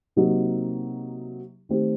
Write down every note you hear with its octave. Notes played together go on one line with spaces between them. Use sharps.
C3 F#3 A#3 D#4 G4
D#3 A3 C4 G4